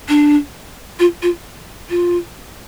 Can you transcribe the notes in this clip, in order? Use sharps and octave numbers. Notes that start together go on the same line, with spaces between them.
D4
F4
F4
F4